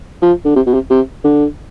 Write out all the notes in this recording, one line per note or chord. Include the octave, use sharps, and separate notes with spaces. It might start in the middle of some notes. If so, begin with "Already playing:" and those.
F3
D3
C3
B2
C3
C3
D3